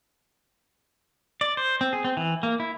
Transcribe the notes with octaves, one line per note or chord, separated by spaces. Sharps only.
D5
C5
C4
G#4
C4
E3
A#3
E4